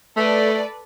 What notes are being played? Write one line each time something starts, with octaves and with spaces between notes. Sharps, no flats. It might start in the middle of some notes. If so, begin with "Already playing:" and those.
A3 A4 B4 D5